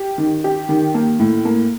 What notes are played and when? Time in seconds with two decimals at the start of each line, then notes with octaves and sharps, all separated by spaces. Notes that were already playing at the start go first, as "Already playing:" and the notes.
Already playing: G4
0.18 D#3
0.44 G4
0.69 D#3
0.94 A#3
1.19 A2
1.45 A#3